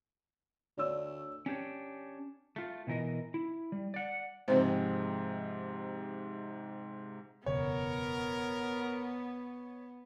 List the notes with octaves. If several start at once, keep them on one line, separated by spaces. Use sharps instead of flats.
D2 C#5 D5 E6
C#4 D4 G4 C#5
A3 F4
B2 E3 A#4 D#5
E4
G3
D5 F#5
G#2 C3 F3 G#3 C4 C5
E1 F#2 C#3 B3 A#4 C#5